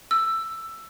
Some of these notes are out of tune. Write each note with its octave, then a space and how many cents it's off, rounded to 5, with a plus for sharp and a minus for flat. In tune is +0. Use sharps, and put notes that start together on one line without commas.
E6 +10